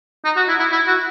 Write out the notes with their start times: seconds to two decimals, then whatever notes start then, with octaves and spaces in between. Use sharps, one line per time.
0.25 D#4
0.37 F#4
0.48 E4
0.60 E4
0.72 E4
0.87 F#4